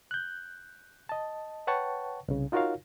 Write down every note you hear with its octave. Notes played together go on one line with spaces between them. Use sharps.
F#6 G6
D#5 A5
B4 C#5 F#5 G5 A5 C#6
C2 C#3
D#4 F4 F#4 A#4 C#5 F5